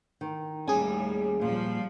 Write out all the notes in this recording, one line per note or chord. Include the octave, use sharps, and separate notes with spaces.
D#3
D#2 A2 G3 C#4 G#4 G#5
A#2 F3 G3